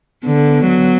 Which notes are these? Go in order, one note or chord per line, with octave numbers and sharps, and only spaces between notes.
D3 B3
F#3